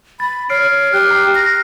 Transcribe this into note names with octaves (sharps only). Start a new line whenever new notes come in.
B5 A6
C#5 F6 C7 D7
C#5
G4 F6 F#6
A#5 F#6 C7
A#6